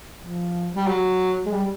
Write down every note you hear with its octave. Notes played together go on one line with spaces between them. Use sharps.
F3
G3
F#3
G#3
G3